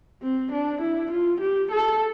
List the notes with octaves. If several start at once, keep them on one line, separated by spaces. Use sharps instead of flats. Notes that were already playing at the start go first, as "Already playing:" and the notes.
C4
D4
E4
F4
G4
A4